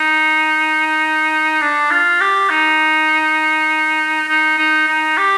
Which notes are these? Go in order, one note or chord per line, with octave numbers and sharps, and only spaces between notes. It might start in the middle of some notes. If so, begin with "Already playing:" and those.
Already playing: D#4
D4
F4
G4
D#4
D#4
D#4
D#4
G4